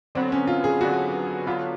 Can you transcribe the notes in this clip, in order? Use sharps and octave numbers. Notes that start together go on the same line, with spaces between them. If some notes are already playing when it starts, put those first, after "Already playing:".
D3 F#3 B3 C4
C#4
F4
G#4
D3 F#3 B3 F#4
D3 F#3 B3 F4